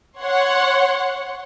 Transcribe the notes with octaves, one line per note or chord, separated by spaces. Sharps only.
C#5 F#5 C6